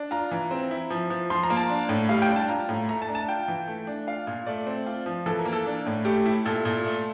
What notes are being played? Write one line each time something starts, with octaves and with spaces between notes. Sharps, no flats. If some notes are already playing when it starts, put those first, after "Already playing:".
Already playing: D4
F4 A#5
E3
C4
E4
F3
F3
F3 C6
A#5
A#3
A5
D4
A2
G3 F5
G5
D4
A5
F4 A#5
A2
A3 A#5
A5
D4
A5
F4 G5
E3
A3
D4
F4 F5
A#2
A3 D5
C4
F4
F3
E3 A4
A#4
A#3
A4
D4
A2
A3 G4
E4
A#2 A4
A#2
A3